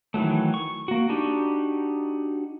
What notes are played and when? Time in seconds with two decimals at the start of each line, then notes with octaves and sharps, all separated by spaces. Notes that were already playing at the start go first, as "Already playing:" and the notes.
0.14 D#3 E3 F#3 A3
0.54 C#6
0.88 A#3 F#4
1.09 D4 D#4 F#4 G4